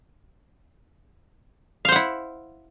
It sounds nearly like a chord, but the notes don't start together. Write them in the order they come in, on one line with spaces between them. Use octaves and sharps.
F5 C5 F#5 E4